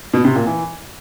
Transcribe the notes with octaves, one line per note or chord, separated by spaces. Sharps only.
B2
C3
A#2
E3